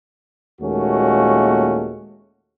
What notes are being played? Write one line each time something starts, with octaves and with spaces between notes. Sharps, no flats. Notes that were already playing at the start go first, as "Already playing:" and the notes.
D#2 A#2 G#3 A3 C#4 F#4